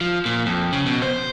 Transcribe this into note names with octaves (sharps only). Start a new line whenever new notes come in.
F3
A#2
F2
C#3
B2
C5